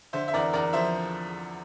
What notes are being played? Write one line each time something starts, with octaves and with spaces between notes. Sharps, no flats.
D3 C5 E5
E5
E2 A#4 D5
E2 A#4 D5
F3 C5 E5